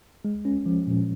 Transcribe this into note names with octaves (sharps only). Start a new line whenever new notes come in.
G#3
C#4
F3
A#2